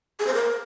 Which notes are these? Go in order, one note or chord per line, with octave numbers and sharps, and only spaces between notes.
G#4
C5
A#4